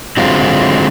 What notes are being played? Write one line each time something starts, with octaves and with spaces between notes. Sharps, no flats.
D3 F#3 G#3 C4 F4